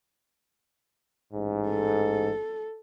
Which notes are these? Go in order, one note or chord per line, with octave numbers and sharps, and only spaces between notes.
A1 G#2
A4